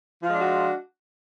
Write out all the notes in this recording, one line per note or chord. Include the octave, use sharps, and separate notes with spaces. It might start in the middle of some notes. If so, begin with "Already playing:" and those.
F3 G#3 D4 F4 F#4